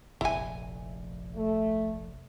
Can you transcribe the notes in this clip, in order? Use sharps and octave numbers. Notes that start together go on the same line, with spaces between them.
F1 A#1 E4 G#5
A3